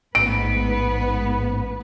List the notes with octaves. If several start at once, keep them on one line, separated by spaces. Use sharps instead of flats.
A1 G#2 B3 B4 D7